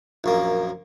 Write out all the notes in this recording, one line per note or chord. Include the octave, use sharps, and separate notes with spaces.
A#1 F#2 A#3